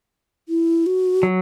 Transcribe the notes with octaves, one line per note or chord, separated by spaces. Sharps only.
E4
F#4
F#3